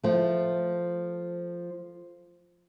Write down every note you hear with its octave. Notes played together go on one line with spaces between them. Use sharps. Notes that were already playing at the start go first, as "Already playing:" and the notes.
F3 A3